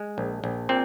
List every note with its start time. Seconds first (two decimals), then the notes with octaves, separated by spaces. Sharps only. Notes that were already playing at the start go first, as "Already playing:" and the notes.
Already playing: G#3
0.18 A#1
0.44 A#1
0.69 A#2 C4